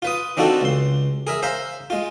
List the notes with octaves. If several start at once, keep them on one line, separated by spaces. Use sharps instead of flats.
F4 B4 D#6
D#3 C4 D4 F4 F#4 A4
C#2 C6
G#4 A#4 E5
C5 E5 F5 A#5
G#3 F4